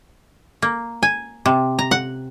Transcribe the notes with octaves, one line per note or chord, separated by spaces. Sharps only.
A#3
G#5
C3
A#5
F#5